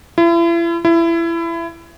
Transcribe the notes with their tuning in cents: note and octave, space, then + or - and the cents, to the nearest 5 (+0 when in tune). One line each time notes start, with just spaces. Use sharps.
E4 +40
E4 +25